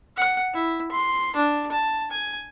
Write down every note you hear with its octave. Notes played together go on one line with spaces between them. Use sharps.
F#5
E4
C6
D4
A5
G#5